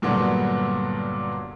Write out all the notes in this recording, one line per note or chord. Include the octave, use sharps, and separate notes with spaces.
G2 A#2 D3 F#3 B3